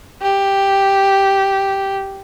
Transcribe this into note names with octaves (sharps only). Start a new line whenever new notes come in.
G4